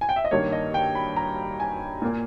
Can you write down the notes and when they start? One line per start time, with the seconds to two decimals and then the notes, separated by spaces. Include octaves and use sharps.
0.01 G#5
0.09 G5
0.16 E5
0.25 D#5
0.31 G2 D#3 A#3 C#5
0.52 D#5
0.74 G5
0.95 B5
1.16 A#5
1.60 G#5
2.02 A#2 A#3